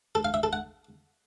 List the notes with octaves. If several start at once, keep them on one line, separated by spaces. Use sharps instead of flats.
A4
F5
E5
A4
F#5